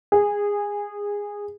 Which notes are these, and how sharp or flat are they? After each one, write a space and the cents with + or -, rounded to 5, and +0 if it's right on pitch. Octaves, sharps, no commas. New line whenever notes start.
G#4 -20